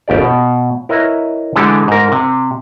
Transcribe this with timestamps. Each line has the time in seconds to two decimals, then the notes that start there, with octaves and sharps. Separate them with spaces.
0.08 G1 D#2 G4 D5
0.21 B2
0.89 E4 A#4 B4 C#5 D#5 E5
1.56 D3 E3 G#3 G4 A4
1.88 G#2 A#4
2.12 C3